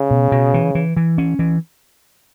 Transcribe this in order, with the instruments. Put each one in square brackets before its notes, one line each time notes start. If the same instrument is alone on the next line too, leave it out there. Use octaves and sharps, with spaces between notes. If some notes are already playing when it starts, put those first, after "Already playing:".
Already playing: [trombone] C#3
[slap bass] B2
B2
E3
E3
E3
C#4
E3